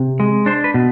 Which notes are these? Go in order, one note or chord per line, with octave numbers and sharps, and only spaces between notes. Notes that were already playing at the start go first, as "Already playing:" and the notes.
Already playing: C3
G#3
D4 C5
B4
B2